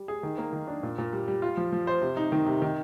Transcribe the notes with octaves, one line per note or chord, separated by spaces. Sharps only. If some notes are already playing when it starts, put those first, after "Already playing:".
Already playing: G3
G#4
D#3
A#3
D#3
D4
A#2
A#2
G3
G3
F4
F3
F3
C5
C3
D#4
D#3
C3
D#3